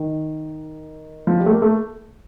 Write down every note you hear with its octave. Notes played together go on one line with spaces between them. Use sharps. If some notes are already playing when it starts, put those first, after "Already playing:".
Already playing: D#3
F3
G3
A3
A#3
A3